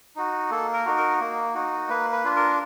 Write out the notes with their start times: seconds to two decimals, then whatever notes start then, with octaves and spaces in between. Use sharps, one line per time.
0.16 D#4 F#4
0.51 A#3 A4
0.74 A#4
0.86 D#4 F#4
0.97 A#4
1.20 A#3
1.55 D#4 F#4
1.89 A#3 B4
2.12 B4
2.24 D4 F4
2.36 A#4